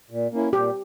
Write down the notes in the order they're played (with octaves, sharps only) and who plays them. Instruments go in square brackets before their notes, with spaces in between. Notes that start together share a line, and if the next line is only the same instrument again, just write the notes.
[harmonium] A#2
A#3 C#4 E4
[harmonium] A#2 [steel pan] G4